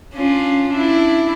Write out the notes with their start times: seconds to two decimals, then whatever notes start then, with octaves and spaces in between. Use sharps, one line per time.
0.14 C#4 D4 F4
0.70 D4 E4